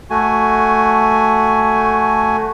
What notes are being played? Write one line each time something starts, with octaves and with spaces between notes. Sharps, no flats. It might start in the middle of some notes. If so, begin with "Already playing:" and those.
A3 F#4 G#5